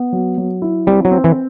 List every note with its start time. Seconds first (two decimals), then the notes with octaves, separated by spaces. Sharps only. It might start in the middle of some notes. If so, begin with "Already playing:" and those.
Already playing: B3
0.13 F#3
0.38 F#3
0.62 E4
0.87 G3 C4
1.05 F#3
1.11 C4
1.24 E3